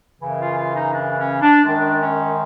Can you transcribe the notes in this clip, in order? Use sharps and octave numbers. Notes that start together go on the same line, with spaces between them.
F#2 C#3 E3
F4
F4
D#4
D4
C#4
D4
F#2 D#3 G#3 D4
C#4